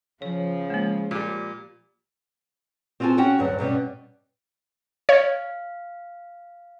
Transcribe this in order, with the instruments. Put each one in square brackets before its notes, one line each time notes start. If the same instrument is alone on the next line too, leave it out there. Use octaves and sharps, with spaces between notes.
[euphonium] C#3 [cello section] F3 [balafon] C#5
[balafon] G#3 A#3
[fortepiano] A#2 G3 [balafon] D6
[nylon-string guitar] C4 F4 F#4 A4 G#5 A5
C#4 F#4 F#5 G5
D2 G2 F#3
G2 B2 G3 C#4
[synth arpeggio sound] C#5 [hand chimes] F5